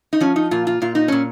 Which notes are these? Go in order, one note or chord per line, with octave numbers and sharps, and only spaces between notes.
D#4
F3 C#4
D#4
A#2 F4
F4
A#2 F4
D#4
A#2 C#4